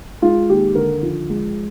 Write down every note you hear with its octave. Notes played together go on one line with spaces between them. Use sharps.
G#3 F4
D#2 G4
D3 A#4
F3
G#3